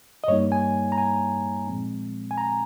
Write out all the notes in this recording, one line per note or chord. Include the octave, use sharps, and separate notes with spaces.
D#5
G2 G3 A#3 D#4 C#5
G#5
A#5
G#5
A#2 F3 G#3 C4
G#5
A#5